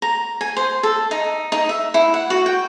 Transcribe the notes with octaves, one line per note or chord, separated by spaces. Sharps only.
A#5
G#5
C5
A4
D#4
D#4
E5
E4
F#5
F#4
G5